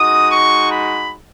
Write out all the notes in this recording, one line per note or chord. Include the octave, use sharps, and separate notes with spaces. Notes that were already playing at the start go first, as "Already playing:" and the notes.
Already playing: G#3 D#4 F#4 D#6
C#6
B5